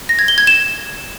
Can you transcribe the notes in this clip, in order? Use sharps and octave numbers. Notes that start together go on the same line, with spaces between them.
A#6
G#6
G7
G#6
E7